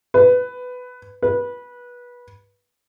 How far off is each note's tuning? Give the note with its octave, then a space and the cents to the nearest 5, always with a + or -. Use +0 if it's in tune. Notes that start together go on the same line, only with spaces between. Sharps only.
B4 +15
B4 -20